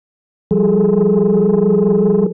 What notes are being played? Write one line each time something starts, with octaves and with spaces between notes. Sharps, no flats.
F3 G3 G#4 A4